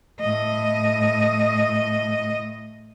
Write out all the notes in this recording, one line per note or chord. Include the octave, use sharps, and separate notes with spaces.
A2 D#5